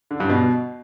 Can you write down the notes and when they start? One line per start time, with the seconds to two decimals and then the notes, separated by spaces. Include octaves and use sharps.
0.11 D3
0.20 G2
0.30 B2